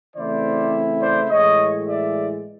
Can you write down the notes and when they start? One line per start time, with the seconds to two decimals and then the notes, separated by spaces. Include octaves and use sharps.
0.15 C#3 E3 A3 C4 E4 C5 D5
1.01 C5 D5
1.29 A2 E3 G#3 C#5 D#5
1.86 D5 E5